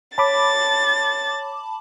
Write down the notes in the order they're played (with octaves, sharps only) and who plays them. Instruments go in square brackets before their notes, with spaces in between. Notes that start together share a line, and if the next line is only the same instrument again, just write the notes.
[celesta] C#5 [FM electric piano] A5 B5 D6 [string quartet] A6